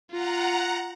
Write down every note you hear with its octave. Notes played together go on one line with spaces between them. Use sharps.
F4 F#5 A#5